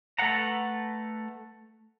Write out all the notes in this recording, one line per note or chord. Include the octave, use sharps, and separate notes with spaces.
A3 A4 B4 F#5 A#5